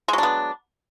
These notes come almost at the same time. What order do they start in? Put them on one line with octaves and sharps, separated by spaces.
G#3 F#3 D4 B3